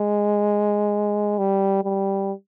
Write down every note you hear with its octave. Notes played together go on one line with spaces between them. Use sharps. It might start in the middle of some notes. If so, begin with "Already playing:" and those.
Already playing: G#3
G3
G3